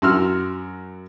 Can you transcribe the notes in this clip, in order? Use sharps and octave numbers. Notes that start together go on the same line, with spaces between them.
F#2 F#4 C6 E6 F6